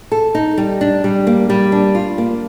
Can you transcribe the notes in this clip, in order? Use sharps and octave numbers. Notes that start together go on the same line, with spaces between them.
A4
D#4
G3
D4
G3
A#3
G3
D4
F4
A#3